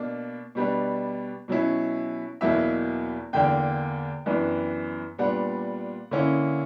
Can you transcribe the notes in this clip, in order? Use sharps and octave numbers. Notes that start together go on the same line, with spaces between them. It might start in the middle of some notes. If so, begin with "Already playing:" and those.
Already playing: B2 A#3 D4
B2 G3 B3 D4
B2 F#3 C#4 E4
E2 B2 F#3 A#3 E4 E5
E2 D3 A#3 D4 G5
F#2 E3 B3 D4
A#2 G3 B3 D4 F#5
D3 A#3 C#4 E4